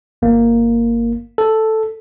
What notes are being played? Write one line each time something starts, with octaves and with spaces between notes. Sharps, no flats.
G1 A#3
A4